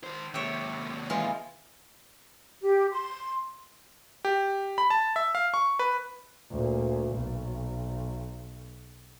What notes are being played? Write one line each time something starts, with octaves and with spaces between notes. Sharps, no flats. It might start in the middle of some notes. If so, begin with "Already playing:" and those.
D#3 C5
D#2 C3 C#5 E5 G5
E3 G#3 F4
G4
C6
G4
B5
A5
E5
F5
C#6
B4
D2 A#2
B1